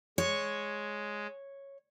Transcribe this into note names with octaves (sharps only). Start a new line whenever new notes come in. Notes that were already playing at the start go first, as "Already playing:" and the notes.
G#3 C#5